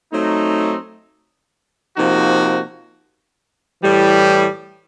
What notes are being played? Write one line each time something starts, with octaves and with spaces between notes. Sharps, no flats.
F#3 A3 C4 D#4
C3 F3 A#3 D#4 F#4
A2 E3 G3